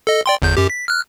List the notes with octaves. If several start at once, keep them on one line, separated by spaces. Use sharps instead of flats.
A4 D#5
D5 G5 C6
G1 E2 G6
F#2 G4
B6
F6 F#6